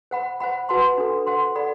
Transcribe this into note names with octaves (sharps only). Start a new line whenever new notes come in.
C5 F#5 B5
C5 F#5 B5
F#4 B4 F#5 A5 C6
D4 F#4 A4
C5 F#5 C6
A4 D5 F#5 B5